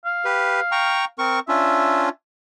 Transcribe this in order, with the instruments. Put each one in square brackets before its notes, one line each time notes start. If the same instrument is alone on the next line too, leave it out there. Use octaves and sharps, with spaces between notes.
[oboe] F5
[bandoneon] G4 B4
G5 A#5 C#6
C4 A#4 C#6
[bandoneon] C#4 D4 F4 [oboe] E5